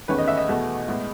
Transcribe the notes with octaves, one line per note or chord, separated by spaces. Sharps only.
E2 D#3 A3 C#4 B4
D#5
E5
D#5
E2 B2 A3
A2 G#3 B3